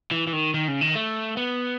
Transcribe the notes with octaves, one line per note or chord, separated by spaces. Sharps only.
E3
E3
D#3
D#3
C#3
D#3
A3
B3